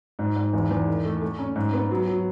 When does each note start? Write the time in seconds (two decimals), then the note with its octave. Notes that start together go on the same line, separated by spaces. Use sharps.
0.19 G#2
0.36 G#2
0.53 E2
0.71 E2
0.88 D#3
1.05 A3
1.22 A3
1.39 C#4
1.56 G#2
1.73 B3
1.91 F#3
2.08 F#3